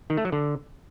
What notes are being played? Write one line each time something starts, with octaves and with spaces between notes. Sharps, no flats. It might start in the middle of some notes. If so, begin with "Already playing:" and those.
D#3
A3
F#3
D3